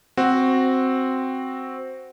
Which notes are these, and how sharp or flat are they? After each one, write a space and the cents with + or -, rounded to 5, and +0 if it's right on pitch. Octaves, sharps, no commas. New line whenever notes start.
C4 +0 F#4 +0